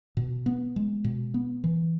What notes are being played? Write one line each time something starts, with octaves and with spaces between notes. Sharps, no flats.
B2
B3
G#3
B2
B3
E3